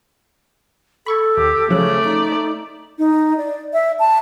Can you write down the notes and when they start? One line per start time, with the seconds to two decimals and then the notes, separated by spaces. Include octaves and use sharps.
1.06 A4 B5 C#6 G#6
1.37 D#2 G4
1.70 C#3 F3 F#3 A3 D5 F#6
2.04 D#4
2.98 D#4
3.37 D5
3.73 E5
3.99 A5